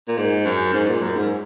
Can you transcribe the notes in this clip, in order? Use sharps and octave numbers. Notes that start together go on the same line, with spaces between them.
A#2
G#2
F#2
G#2
A#2
F#2
G#2